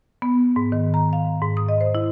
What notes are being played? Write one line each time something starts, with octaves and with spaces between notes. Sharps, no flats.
B3
G#2
D#3
A#5
F5
G#2
D#6
D#5
C5
E4